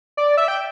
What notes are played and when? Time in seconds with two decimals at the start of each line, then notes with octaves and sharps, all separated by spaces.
0.17 D5
0.37 E5
0.48 G5